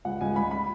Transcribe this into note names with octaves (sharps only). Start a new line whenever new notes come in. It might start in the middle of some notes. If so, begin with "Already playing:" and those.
C#2 F#5
C#2 G#5
C#2 B5
B5